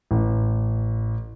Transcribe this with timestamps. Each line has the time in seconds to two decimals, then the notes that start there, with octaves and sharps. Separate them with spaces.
0.11 A1